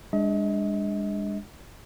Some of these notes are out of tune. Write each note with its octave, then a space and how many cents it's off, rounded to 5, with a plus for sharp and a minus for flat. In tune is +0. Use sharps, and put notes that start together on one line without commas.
G#3 -35 D4 +0 D#5 +40